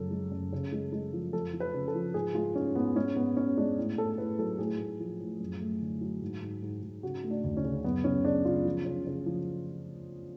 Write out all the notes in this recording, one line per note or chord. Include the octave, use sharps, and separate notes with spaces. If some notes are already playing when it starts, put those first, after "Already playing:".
Already playing: F#2 C#3 F3 A4
G#3
F#2
C#3
G#3
G#3
F3
F2 A4
F3
B4
C#3
A4
F3
G#2 G#4
G#3 F4
G#2 C#4
G#2 B3
G#3 C#4
G#2 B3
G#2 C#4
G#3 D4
A2
A2 A4
A2 B4
F#3 A4
A2 G#4
A2
F3
A2
F#2
A3
D3
F#3
G#2
G#2
G#2
G#2
C#3 F#4
A3
D4
D2
C#4
C#3
F#2 B3
C#3 C#4
C#3 D4
C#3 F4
F3
C#3
C#3
F3